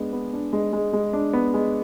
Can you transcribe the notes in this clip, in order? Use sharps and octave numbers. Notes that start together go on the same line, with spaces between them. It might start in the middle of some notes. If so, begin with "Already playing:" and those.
Already playing: G#3 B3 D4
B3
D4
G#3
G#3
G#3
D4
B3
G#3